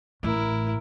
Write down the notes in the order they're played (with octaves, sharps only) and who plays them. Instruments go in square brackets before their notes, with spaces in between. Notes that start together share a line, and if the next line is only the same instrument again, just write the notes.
[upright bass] A1 A2 [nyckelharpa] E4 A#4